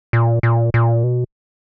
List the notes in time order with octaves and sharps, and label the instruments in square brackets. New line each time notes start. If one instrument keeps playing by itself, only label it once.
[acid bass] A#2
A#2
A#2
B2